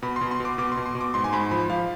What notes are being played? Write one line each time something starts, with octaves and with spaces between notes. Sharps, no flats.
B2 B5
C6
B2
C6
B2 D6
B2 D6
C6
B2
C6
B2
D6
G#2 C6
G#5
G#2 B5
F3 B5
F3 F5